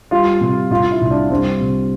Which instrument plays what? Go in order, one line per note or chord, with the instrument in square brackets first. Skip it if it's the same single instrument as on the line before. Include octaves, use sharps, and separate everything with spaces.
[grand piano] G3 [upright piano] F4
[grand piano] C3
[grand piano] C3 [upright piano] F4
[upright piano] E4
[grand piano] C2
[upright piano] D4
[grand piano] G3 [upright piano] C4
[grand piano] C3